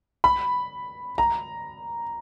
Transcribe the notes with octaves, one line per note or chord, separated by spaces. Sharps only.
B5
A#5